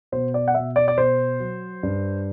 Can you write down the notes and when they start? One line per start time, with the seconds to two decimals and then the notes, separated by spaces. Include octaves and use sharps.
0.12 B2 C5
0.34 D5
0.48 F#5
0.55 B2 E5
0.76 D5
0.88 D5
0.98 B2 C5
1.40 F#3
1.83 G2